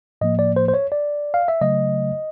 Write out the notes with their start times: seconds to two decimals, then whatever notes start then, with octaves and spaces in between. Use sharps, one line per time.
0.21 A2 F3 A#3 D#5
0.39 D5
0.56 C5
0.68 C5
0.74 C#5
0.92 D5
1.34 F5
1.48 E5
1.61 C#3 F#3 A3 D#5